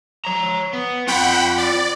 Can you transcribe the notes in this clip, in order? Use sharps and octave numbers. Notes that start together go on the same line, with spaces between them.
C#5 A#5
B3
C4 F4 F#5 G5 B5
D5